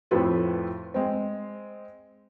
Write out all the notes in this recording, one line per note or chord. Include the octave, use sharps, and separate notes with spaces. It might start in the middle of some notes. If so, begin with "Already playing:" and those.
F2 A2 F3 F4 A4 B4
G#3 C4